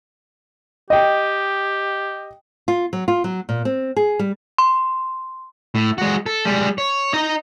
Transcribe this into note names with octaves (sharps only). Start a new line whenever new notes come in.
G4 D#5 G5
F4
F#3
F4
F#3
A#2
C4
G#4
G3
C6
A2
G#3 F#4
A4
G3 G#3
C#5
D#4 D#5